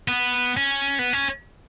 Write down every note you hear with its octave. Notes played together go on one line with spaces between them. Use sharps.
B3
C#4
B3
C#4